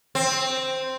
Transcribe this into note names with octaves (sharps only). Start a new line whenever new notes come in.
C4